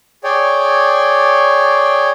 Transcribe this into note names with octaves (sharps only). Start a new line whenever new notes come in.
G#4 C#5 D5 G5